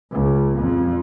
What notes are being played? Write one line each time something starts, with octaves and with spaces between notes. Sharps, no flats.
C#2
F2